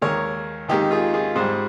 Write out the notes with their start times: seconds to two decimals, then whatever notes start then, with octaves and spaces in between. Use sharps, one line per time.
0.01 D#2 D#3 G#3 A#4 C#5
0.68 D#2 D#3 G#3 D#4 G4
0.91 F4 G#4
1.14 F4 G#4
1.35 G#2 G3 G#4 C5